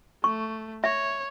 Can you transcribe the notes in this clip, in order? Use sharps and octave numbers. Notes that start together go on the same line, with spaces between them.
A3 C#6
C#5 E5